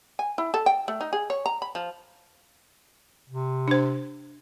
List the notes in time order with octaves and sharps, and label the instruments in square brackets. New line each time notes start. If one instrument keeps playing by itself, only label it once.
[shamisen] G#5
E4
A4
G5
A3
D#4
G#4
C#5
A#5
B5
F3
[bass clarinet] C3
[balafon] D4 C5